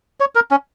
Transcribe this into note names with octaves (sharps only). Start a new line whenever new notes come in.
C#5
A#4
C#4